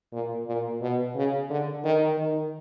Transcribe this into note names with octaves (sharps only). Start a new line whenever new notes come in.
A#2
A#2
B2
C#3
D3
D#3
D#3